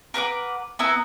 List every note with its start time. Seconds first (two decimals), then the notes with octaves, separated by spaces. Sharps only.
0.14 A#4 B4 F#5 D6
0.79 B3 E4 A#4 E6